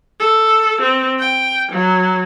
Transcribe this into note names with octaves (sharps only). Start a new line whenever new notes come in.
A4
C4
G5
F#3